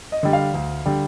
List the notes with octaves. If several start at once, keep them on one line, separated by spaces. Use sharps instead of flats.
D#5
D3 G3
F5
D2
D3 G3